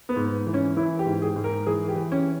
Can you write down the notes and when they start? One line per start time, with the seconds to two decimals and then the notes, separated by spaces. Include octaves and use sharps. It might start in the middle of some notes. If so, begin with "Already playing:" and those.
0.09 B3
0.16 G#2
0.47 E3
0.54 C#4
0.76 E3 E4
0.99 G4
1.06 G#2
1.22 G#4
1.36 G#2
1.44 A#4
1.67 E3 G#4
1.89 G4
1.96 E3
2.12 C#4